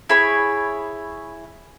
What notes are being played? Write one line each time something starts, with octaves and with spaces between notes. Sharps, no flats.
E4 G#4 C#5 B5